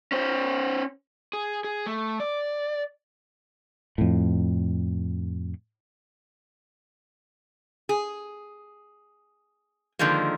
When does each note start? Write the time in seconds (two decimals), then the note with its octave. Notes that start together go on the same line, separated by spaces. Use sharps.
0.12 C#4 C5
1.33 G#4
1.64 G#4
1.86 A3
2.20 D5
3.98 F2 A2
7.89 G#4
9.99 D3 D#3 F3 G#3 A#3